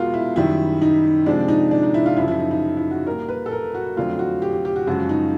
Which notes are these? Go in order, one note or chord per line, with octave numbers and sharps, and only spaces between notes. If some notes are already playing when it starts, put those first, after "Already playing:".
Already playing: E2 B2 G#3 F4 F#4 A#4
E4
F#2 D#3 G3 E4
D#4
C3 F3 G#3 D4
D#4
D4
D#4
E4
F4
F#2 C#3 F3 E4
E4
D#4
D#4
E4
F#4
A#2 G3 A#4
B4
A4
A#4
F#4
F2 D3 F#3 A3 F4
F#4
G4
G4
G4
F#4
F#2 C#3 F3 G#3 F#4
D#4